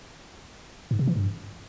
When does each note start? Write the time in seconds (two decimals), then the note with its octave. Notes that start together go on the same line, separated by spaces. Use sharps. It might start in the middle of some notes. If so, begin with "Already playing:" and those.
0.91 G#2
0.99 C3
1.07 E3
1.16 G2